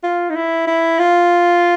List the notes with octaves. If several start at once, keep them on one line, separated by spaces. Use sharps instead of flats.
F4
D#4
E4
E4
F4